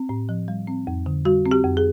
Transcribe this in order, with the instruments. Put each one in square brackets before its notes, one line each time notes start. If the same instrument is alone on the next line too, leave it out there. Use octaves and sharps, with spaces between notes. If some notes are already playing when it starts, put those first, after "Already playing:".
Already playing: [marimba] C4
A2
F3
G3
C4
F2
D3
G3 F#4
C4
G4
F2
G#4